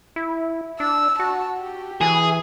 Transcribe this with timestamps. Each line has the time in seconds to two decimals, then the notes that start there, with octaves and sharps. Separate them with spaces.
0.16 E4
0.80 D4 E6
1.19 F#4 A5
1.59 G4
2.01 E3 G#4